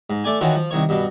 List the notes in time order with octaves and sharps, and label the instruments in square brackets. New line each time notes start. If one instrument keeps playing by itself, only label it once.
[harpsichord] G#2
A3 D5 G#5
D#3 E3 C#4 F4 F#4
F3
C2 D#3 C#5
G2 B2